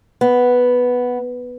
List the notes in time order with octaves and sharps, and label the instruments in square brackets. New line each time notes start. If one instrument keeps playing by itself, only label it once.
[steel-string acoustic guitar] B3